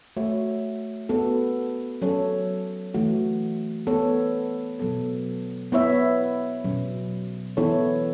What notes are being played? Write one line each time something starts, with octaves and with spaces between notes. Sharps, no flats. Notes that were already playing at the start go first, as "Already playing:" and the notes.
A3 F#4 C#5 E5
B3 F#4 A4
F#3 C#4 A4 C#5
E3 A3 F#4
B3 A4 C#5
B2 F#3 B3 A4
B3 E4 C#5 E5
B2 F#3 C#4
E3 B3 E4 A4 C#5